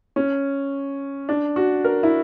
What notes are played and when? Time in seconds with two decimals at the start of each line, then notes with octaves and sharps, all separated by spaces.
0.16 C#4
1.29 D4
1.56 F#4
1.84 A#4
2.03 E4